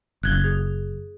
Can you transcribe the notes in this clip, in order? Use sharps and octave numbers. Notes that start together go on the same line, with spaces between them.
F#1 F#6 G#6 G7
G#4